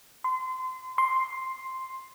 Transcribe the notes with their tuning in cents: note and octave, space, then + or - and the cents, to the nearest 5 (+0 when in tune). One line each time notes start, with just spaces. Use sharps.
C6 -30
C6 +5